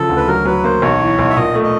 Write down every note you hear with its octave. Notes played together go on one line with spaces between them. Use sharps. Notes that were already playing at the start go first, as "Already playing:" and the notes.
Already playing: C#3 F3 A4
D2
B4
F#3 A#4
F#3 B4
A#3 C5
B1 C#5
E3
B1
E5
A#2 D#5
A3
D#5